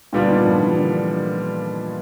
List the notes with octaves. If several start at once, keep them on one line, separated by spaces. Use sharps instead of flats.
A#2 D3 G3 B3 D4 F4
D#3
F3
E3
D3